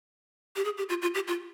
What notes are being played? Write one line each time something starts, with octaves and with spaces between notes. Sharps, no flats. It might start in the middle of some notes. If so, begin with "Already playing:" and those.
G4
G#4
G4
F4
F4
G4
F4